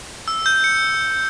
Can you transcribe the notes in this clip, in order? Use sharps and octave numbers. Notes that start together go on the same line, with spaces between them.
E6
G6
C#7